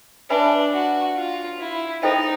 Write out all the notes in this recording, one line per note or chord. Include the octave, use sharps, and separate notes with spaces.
D4 B4 E5 G#5 B5
F#4
F4
E4
D#4 E4 A4 C5 D#5 G5